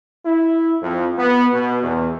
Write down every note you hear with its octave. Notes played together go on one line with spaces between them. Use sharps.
E4
F2
B3
B2
E2